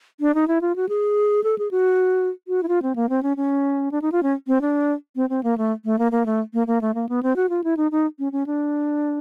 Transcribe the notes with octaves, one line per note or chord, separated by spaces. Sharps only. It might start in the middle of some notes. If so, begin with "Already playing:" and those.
D4
D#4
E4
F4
F#4
G#4
A4
G#4
F#4
F#4
E4
F4
C4
A#3
C4
C#4
C#4
D4
D#4
F4
C#4
C4
D4
C4
C4
A#3
A3
A3
A#3
A#3
A3
A#3
A#3
A3
A#3
B3
C4
F#4
F4
E4
D#4
D#4
C#4
C#4
D4